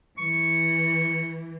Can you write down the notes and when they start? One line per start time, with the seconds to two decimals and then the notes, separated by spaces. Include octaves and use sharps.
0.18 E3 C#6